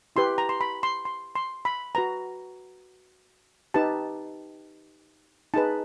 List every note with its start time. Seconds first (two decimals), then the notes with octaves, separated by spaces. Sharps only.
0.16 E4 G4 B4 C6
0.38 A#5
0.49 C6
0.61 B5
0.83 C6
1.05 C6
1.36 C6
1.65 B5
1.95 F#4 B4 A#5
3.74 D#4 G4 B4 A5
5.54 D#4 G#4 B4 A5